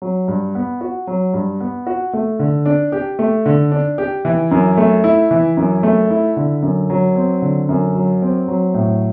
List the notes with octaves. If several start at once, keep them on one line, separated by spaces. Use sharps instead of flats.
F#3
G2
B3
F#4
F#3
G2
B3
F#4
A3
D3
D4
G4
A3
D3
D4
G4
E3
F#2
A3
E4
E3
F#2
A3
E4
D3
F#2
F#3
C4
D3
F#2
F#3
C4
F#3
A2